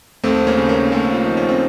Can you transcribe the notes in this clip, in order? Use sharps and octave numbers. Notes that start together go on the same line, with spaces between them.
D#2 A3 C4
A#3 C#4
C#3
A#3 C#4
D#2 A3 C4
F4
F3 D#4
C#4
C4